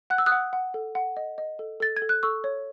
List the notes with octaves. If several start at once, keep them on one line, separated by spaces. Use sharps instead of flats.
F#5 F#6
E6
D#6 F#6
F#5
F#5
A4
F#5
D#5
D#5
A4
A4 A6
G#6
A4
F#6
A4 C#6 E6
C#5